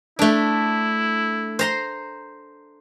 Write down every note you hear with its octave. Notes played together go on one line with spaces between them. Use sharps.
A3 D4 E4
C5 A#5 C6